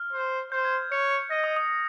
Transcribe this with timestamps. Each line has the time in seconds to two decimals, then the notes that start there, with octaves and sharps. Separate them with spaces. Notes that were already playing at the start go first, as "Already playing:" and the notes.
Already playing: F6
0.13 C5
0.52 C5 G6
0.65 G#6
0.92 C#5 C#7
1.11 C#7
1.30 D#5 A#6
1.44 D#6
1.56 D#6